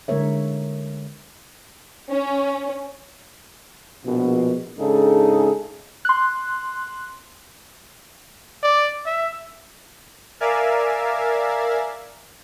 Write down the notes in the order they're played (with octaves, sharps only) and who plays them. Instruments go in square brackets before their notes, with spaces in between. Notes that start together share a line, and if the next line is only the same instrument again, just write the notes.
[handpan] D3 G#3 A#3 A#4 C#5 E5
[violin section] C#4
[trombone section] A#1 B2
G#2 C#3 D4 D#4 G#4 A4
[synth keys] C6 F#6
[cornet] D5
E5
[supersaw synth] A#4 D5 E5 F5 G#5